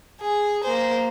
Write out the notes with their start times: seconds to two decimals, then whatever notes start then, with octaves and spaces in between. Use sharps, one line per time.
0.21 G#4
0.64 A#3 C5